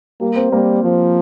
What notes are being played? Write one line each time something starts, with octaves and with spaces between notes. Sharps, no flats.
G3 A#3
C4
G3 A#3
F3